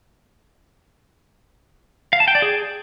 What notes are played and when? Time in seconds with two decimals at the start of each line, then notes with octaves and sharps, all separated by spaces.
2.13 F5
2.20 A5
2.28 G5
2.35 D5
2.42 G#4